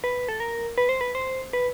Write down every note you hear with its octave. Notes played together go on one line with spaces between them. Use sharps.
B4
A4
A#4
B4
C5
B4
C5
B4